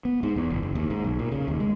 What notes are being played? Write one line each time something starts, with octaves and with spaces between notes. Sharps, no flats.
B3
G#2
E2
F#1
F#1
D#2
G#2
B1
A#2
C#3
D#2
G#3